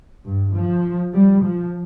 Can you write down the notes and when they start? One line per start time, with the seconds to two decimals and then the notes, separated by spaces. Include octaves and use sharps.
0.25 G2
0.54 F3
1.13 G3
1.43 F3